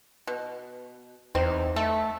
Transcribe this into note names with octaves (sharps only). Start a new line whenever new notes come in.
B2
E2 C4 D#4 C5
A3 A4 E5